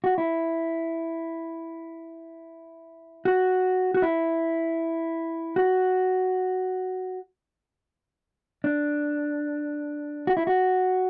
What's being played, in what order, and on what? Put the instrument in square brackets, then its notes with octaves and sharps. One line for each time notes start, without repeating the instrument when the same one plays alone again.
[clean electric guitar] F#4
E4
F#4
F#4
E4
F#4
D4
F#4
E4
F#4